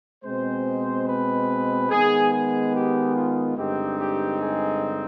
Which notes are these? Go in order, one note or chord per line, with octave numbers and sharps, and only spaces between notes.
B2 G#3 C4 C5
B4
D#3 G#3 B3 G#4
G#4
G4
F4
G2 D3 G#3 C4 D#4 G4
G4
G#4